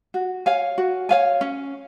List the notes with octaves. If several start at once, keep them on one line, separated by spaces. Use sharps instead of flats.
F#4
C#5 F5 G#5
F#4
C#5 F5 G#5
C#4